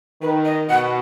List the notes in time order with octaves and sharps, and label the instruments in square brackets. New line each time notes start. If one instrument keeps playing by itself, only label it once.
[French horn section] D#3 [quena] B4
[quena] D#5
[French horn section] B2 [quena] F#5